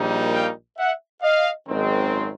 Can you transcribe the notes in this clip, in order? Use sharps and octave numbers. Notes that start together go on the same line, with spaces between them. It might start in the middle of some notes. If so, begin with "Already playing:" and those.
Already playing: A#1 A#2 G3 A#3 D#4
F5 G5
E5 F#5
D#5 F5
G#1 F#2 D#3 G#3 C4